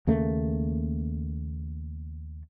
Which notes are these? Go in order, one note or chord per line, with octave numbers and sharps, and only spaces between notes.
D#2 C#3 A3 A#3